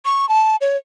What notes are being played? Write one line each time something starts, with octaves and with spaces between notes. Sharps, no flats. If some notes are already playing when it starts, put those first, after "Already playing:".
C#6
A5
C#5